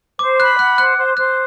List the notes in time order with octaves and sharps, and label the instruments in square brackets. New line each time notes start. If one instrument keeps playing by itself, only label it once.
[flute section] C5 [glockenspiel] D6
[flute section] B5 [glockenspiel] F#6
[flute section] F#5 [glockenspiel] F#6
[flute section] C5 [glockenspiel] F#6
[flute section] C5
[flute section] C5 [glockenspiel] F#6